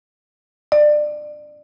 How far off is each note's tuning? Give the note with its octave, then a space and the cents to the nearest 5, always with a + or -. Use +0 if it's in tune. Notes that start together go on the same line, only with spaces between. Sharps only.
D5 +25